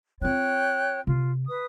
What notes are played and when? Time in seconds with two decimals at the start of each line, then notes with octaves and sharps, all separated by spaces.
0.21 C4 F4 C#5 G5 F#6
1.07 C3 F4
1.47 B4 D#6